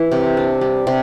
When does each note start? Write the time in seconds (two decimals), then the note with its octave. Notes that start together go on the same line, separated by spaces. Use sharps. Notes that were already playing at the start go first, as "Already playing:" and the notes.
Already playing: E3 E4
0.12 C3
0.37 D4
0.61 G3
0.87 C3